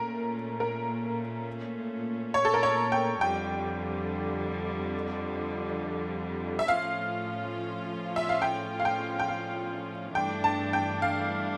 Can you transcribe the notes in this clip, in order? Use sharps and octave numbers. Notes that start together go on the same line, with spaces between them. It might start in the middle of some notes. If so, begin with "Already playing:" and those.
Already playing: A#2 A3 C#4 A#4
A#4
C#5
A4
A#4
C#5
G5
F2 D3 G3 G5
E5
A2 F3 A3 C#4 F4 F5
E5
F5
G5
F5
G5
G5
F5
G2 E3 A3 D4 G5
A5
G5
F5